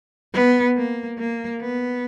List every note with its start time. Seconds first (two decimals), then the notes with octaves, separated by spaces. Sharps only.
0.34 B3
0.77 A#3
1.19 A#3
1.61 B3